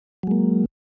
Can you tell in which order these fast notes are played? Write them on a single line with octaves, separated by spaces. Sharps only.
F#3 G#3 A#3